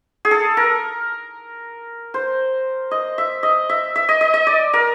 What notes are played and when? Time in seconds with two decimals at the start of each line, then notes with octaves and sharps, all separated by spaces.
0.25 G#4
0.31 A4
0.57 A#4
2.14 C5
2.91 D#5
3.18 E5
3.43 D#5
3.69 E5
3.96 E5
4.09 D#5
4.21 D#5
4.34 D#5
4.47 D5
4.73 A#4